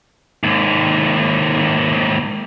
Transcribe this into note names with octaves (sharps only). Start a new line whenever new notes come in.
D#2 G#2